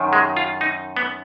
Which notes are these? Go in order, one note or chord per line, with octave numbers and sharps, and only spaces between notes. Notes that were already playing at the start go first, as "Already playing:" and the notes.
Already playing: F#2 D#3
G#3
F4
D#4
B3